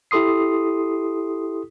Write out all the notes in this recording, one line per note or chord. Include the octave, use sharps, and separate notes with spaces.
E4 G4 A4 C6 D#6 C7